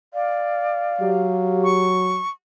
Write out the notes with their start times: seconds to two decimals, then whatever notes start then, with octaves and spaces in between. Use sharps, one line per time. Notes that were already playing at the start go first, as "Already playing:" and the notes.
0.14 D5 F5
1.01 F#3 G4
1.64 C#6